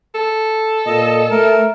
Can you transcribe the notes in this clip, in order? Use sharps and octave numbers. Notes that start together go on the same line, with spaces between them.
A4
A#2 D#5
A3 A#4